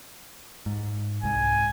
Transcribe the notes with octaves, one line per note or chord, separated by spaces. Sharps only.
G#2
C2 G#2 G#5